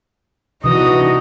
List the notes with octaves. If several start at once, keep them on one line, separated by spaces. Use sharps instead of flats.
C3 E3 D4 D#4 F#4 D#5 D#6